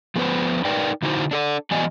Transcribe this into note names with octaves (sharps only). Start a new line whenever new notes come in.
F3 A3 B3 C#4 B4 C5
D#4 A#4 B4 D5 G5
D3 D#4 E4 F#4 C5
D4 A4 D5
E3 F#3 B3 D5 D#5 G#5